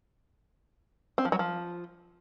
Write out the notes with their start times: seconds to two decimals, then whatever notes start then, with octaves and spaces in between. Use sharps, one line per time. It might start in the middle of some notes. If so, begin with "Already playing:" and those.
1.18 C4
1.25 F3
1.32 F#3
1.39 F3